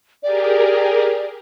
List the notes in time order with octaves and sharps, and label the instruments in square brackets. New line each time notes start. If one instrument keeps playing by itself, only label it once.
[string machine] G4 G#4 A#4 [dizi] D5